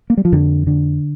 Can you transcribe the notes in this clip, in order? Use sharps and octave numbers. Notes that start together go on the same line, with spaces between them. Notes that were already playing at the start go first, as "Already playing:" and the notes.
A#3
G3
F3
F2 D3
D3